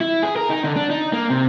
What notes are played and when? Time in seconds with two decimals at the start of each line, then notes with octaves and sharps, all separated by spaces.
0.01 E4
0.23 G#4
0.36 A#4
0.50 D#4
0.64 D3
0.76 D4
0.90 D#4
1.13 A#3
1.30 C3